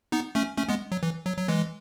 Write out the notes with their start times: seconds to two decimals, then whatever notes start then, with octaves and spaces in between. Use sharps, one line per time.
0.12 B3 D#4
0.35 A3 C#4
0.57 A3 C#4
0.68 G#3 B3
0.92 F#3
1.03 E3
1.26 F#3
1.38 F#3
1.48 E3 G#3